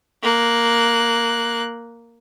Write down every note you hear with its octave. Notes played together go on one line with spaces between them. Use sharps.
A#3 F#6